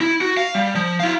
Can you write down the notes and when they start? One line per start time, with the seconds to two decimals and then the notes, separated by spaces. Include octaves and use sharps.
0.01 E4
0.21 F#4
0.37 F5
0.55 G3
0.75 F3
1.00 E4 F5